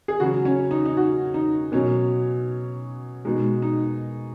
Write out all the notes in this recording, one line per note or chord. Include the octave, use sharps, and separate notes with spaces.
G#4
C#3 F#3 F#4
C#4
D#4
D#4
F#4
D#4
B2 F#3 C#4
B2 G#3 D#4
D#4